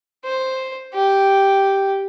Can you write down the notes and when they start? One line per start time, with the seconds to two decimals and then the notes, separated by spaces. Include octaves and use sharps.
0.25 C5
0.94 G4